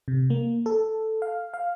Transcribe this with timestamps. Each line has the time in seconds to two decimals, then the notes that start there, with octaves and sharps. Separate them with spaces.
0.08 C3
0.30 A#3
0.66 A4
1.22 F5
1.54 F5